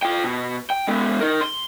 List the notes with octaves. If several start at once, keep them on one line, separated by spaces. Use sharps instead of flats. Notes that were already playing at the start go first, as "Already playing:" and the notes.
F4 G5
B2
G5
G#3 B3
D#4 A#4
C6